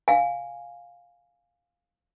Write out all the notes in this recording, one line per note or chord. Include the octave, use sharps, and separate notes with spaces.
F5 G#5